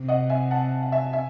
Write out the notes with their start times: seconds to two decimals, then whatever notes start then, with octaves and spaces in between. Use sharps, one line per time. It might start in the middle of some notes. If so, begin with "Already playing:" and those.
Already playing: C3
0.08 D#5 F#5
0.30 E5 G#5
0.51 F#5 A5
0.83 F#5
0.92 E5 G#5
1.13 E5 G#5